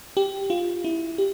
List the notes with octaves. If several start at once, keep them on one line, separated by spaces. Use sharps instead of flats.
G4
F4
E4
G4